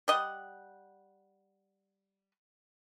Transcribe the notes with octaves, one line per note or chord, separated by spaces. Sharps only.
G3 D#5 F#5